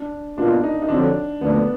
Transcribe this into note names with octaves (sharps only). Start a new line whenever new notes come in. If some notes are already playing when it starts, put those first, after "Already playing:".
Already playing: D4
B2 A#3 D4 F4
D#4
D#4
F2 D3 F#3 D4
D2 D3 F3 A#3 B3 D4